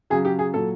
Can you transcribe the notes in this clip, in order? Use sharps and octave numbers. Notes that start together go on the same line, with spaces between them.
C#3 F#3 G#4
G4
G#4
A#2 F#3 A4